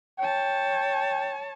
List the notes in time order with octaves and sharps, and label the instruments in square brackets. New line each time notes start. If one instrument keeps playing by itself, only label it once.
[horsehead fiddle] C#5 A5 [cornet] G5